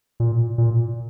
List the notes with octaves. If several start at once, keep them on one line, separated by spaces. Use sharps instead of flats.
A#2
A#2